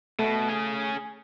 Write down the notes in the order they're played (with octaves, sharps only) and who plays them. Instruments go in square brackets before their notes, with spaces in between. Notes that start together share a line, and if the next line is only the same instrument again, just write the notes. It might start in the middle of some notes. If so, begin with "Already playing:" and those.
[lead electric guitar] B2 [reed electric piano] A3
[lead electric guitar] C#4 G#4